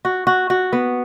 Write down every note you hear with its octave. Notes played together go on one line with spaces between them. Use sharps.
F#4
F#4
F#4
B3